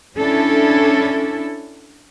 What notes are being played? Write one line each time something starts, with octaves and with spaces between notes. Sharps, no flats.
C#4 D4 E4 A4